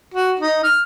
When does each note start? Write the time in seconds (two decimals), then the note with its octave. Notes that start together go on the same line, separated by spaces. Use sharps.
0.14 F#4
0.40 D#4
0.64 F6